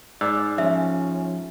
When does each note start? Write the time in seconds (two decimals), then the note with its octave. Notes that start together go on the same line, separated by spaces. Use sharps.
0.21 G#2 D5 E6
0.58 F3 C#4 E5